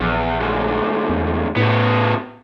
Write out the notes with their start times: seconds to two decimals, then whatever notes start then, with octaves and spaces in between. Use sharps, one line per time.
0.01 A#1 E2
0.40 D2 G#2
1.09 E2
1.56 A2 C#3 B3